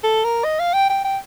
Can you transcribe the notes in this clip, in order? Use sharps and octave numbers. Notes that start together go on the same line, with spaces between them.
A4
A#4
D#5
F5
G5
G5
G5